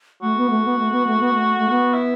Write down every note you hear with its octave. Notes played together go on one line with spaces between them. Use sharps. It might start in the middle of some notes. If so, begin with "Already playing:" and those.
A3 F#4
B3
A3
B3
A3
B3
A3
B3
A3
A3
B3 F#4
E4